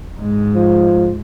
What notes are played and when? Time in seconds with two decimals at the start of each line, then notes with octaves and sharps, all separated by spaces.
0.18 G#2 G#3
0.55 F3